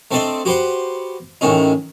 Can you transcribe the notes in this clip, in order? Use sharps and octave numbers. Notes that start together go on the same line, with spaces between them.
A3 C4 D4 A4 C5 D#5
F#4 G4 B4 C5 F#5
A1 A2 D#3 C#4 D#4